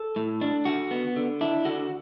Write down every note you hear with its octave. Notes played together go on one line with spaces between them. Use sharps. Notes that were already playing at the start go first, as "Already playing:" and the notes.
Already playing: A4
A2
D4
D3 F#4
B3
D3
D4 E4
D3 F#4